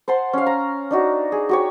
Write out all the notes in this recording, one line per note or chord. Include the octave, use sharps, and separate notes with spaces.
C5 F#5 A5 C6
C#4 F5
A#5
D4 D#4 F#4
G#4
F#4 G4 C#5